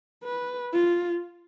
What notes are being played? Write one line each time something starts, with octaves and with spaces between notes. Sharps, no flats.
B4
F4